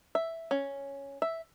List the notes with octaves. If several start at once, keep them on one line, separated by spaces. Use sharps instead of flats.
E5
C#4
E5